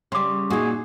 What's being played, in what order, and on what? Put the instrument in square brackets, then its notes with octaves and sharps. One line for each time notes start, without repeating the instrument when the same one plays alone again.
[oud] C#3 G3 [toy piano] C6 D6
[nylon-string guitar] A#2 D#4 [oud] F#4 [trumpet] G#4